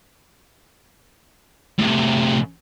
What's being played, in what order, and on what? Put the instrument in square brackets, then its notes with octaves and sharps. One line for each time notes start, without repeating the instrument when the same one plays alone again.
[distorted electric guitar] A2 C3